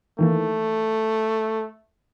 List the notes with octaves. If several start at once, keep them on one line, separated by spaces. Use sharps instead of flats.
D#3 E3 A3 A#3